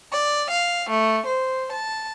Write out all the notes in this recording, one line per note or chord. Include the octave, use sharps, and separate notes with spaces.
D5
F5
A3
C5
A5